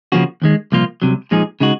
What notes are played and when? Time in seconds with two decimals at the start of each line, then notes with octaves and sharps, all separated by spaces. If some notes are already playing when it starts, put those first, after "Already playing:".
0.12 C#3 F3 A#3 C#4 F#4
0.42 D#2 D#3 G#3
0.72 C2 A#2 F3 A#3 F4
1.02 C2 C3 F#3
1.31 A#2 F3 G#3 D#4 G#4
1.60 C#3 G#3 D#4 F#4